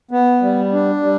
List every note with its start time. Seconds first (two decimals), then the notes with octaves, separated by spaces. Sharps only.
0.11 B3
0.42 G3
0.72 D4
1.03 G3